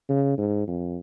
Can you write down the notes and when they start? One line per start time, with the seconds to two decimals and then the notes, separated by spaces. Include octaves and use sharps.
0.09 C#3
0.38 G#2
0.67 F2